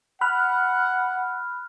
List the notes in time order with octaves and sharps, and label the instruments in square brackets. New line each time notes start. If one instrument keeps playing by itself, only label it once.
[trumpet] F#5 [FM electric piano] B5 F6 F#6